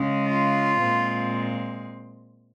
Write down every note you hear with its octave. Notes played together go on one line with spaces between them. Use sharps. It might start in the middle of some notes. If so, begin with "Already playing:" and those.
Already playing: C#3 G#3 C#4
F4
A#2 G#3 C4